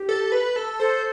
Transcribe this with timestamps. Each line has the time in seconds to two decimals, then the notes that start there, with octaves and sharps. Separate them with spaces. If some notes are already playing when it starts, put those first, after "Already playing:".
Already playing: G4
0.09 A4
0.32 B4
0.56 A4
0.80 A4 C5